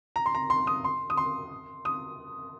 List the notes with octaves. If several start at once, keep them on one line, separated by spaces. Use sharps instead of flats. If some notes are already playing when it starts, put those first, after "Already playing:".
A#5
C6
A#5
C6
D#6
C6
D#6
C6
D#6